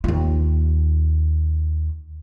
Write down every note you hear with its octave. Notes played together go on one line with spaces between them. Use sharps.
D#2 F4